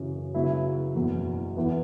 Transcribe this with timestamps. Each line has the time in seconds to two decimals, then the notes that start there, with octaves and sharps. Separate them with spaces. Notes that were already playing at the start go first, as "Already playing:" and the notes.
Already playing: F#2 C#3 E3 C#4
0.34 C#3 F#3 B3 E4 B4
0.95 F#1 E2 B2
1.56 E2 E3 B3